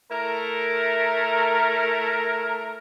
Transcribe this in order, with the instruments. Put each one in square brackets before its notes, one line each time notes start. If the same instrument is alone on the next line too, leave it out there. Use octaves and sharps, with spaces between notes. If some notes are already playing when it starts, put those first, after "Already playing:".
[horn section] A3 E4 A#4